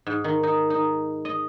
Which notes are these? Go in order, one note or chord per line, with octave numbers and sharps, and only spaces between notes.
G#2
D#3
D#4
D#4
D#5